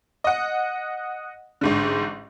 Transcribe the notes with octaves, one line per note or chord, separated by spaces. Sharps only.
D#5 F#5
A1 G#2 D3